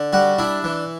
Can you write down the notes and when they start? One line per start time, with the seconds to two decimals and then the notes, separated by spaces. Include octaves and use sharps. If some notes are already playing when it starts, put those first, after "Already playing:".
Already playing: D3
0.13 G3 F#4
0.38 D4 E4
0.64 E3